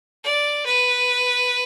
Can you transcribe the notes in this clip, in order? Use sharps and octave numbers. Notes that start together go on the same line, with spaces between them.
D5
B4